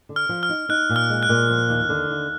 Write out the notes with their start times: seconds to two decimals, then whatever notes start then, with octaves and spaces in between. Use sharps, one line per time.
0.09 D3
0.16 F6
0.29 F3
0.43 F6
0.49 D#4
0.69 D#4 F#6
0.90 A#2
0.96 F6
1.10 G#3
1.23 F#6
1.29 A#2
1.50 F3
1.69 D#2
1.89 D3
2.09 D#2